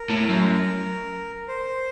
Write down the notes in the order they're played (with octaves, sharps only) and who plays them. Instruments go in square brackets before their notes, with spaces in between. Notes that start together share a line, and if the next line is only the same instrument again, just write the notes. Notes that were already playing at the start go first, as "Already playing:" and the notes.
Already playing: [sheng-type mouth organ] A#4
[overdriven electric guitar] A2
F#2
[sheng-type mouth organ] C5